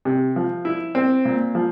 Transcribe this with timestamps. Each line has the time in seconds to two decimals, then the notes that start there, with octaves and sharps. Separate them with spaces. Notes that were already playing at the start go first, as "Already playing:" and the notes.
0.05 C3
0.36 F3
0.65 E4
0.95 C4
1.25 A#2
1.55 F3